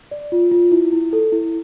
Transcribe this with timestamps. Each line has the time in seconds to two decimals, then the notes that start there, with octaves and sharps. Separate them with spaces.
0.11 D5
0.32 F4
0.51 F4
0.72 E4
0.93 E4
1.13 A4
1.32 E4